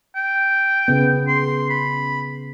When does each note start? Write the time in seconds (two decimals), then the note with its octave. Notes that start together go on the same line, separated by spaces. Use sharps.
0.15 G5
0.88 C#3 B3
1.27 C6
1.70 B5